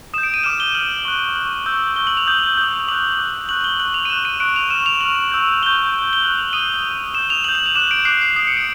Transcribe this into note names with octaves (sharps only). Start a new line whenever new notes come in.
D#6 G6 E7
D7
D#7
D6 F6 E7
G7
D6 F6 F#7
C#6 F#6
C#6 F#6 F#7
C#6 E6 G6
C#6 E6 G6 G7
F#7
F7
D#6 G6 F#7
D#6 G6
D6 F#6 F#7
D6 F#6
C#6 F#6 F#7
G7
C#6 F#6 F#7
F7
D#7
C#6 F#6 E7
D#7
C#6 F#6 D7
F7
C#6 F6 E7
F7
C#6 F6 F#7
C#6 E6 G6
C#6 E6 G6 G7
C#6 F#6
G7
C#6 F#6 F#7
F7
D#6 F#6 D#7
D#6 F#6
D#6 G6 E7
F7
D#6 G6 F#7
F#7
F7
D6 F#6 E7
D7
D6 F#6 C7
C7
D#6 F#6 C7
C#7
D7